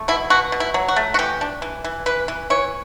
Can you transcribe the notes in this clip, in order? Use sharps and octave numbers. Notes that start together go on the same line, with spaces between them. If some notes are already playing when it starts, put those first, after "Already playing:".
Already playing: A3
B2 E4
B2 F#4
B2
E4
F#3
F#4
A3
F#4
E3 G4
D4
E3
E3
E3 B4
E3
E3 C#5